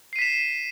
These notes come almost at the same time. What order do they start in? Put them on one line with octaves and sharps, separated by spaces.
C7 D#7 B6 E7